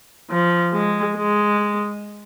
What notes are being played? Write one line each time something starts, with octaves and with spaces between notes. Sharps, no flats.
F3
G#3
G#3